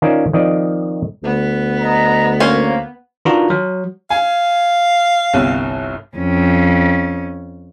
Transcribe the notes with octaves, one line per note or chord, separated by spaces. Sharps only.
D#3 C#4 F4 A#4 C5 D5
D#3 F3 C4 D5 D#5
D2 B3
D#5 A#5
A#3 C#4 C5
D#3 D4 F4 F#4 B4 A#5
F#3
F5 G#5
G1 C2
F2 C#4